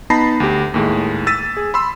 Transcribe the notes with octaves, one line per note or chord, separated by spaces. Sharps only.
B3 D#4 A5 B5 A#6 C7
D2 G4
D#2 A2 G#3
E6 A6 B6 D#7
G#4
B5 C6 E6